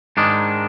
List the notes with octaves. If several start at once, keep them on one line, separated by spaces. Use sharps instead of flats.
G#2 D#3 G#3 D4